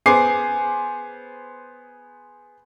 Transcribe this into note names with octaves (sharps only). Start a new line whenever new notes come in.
B3 G#4 C5 G#5 D6 C7